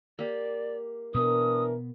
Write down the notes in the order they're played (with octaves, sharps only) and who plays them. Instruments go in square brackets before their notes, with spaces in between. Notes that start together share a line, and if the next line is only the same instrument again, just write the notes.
[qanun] A#3 G4 [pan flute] D5
[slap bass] B2 B3 [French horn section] E3 D4 A#4 [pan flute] D#6